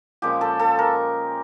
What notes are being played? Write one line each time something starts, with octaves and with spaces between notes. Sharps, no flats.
A#2 F3 G#3 C#4 G4
A4
A4
A#4